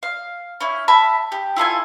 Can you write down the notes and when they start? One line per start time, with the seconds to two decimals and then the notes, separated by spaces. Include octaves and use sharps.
0.03 F5
0.61 C#4 E4
0.88 E5 A5 B5
1.32 G4
1.56 E4 F4 A4 G#5